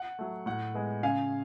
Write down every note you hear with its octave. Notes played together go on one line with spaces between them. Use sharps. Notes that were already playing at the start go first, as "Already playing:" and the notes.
Already playing: F#5
F#3 A3
A2 F#5
G#3 B3
C#3 F5 G#5